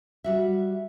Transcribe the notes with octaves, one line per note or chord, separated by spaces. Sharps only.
G3 F#4 E5